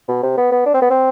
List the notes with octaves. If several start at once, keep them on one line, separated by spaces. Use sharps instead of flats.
B2
C3
B3
B3
D4
C4
B3
C4